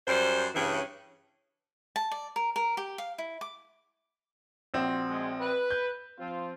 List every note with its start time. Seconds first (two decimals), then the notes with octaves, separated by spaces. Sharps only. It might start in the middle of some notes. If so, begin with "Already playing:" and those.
0.08 F#2 G3 C5
0.55 G2 C#3 E3 C#4
1.96 A5
2.11 D5
2.36 A#4
2.56 A#4
2.77 G4
2.98 F5
3.18 E4
3.41 D6
4.74 A#1 C4 F#4
5.09 G#3
5.40 B4
5.71 G6
6.19 F3 C4 F4